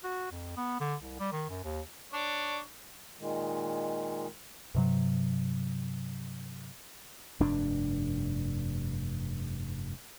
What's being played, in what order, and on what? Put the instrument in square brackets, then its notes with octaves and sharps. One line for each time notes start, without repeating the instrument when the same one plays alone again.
[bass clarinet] F#4
F2
B3
D3
C2
G3
D#3
F#2
D#2
[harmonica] D4 C#5 D5
[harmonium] A#2 D#3 G#3
[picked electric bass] G2 C3 F#3
[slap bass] F1 G2 D4